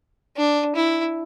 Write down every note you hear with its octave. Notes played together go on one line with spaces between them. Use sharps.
D4
E4